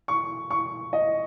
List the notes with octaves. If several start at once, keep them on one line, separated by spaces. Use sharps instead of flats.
C#6
C#6
D#5